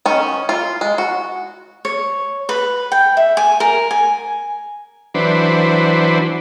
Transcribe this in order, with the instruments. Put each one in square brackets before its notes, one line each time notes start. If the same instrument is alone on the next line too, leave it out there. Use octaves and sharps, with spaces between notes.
[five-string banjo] D#3 C#4
F4
G#3
F#4
[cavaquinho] C#5
B4
G5
E5
G#5
A#4
G#5
[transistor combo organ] E3 F#3 D4 B4 C5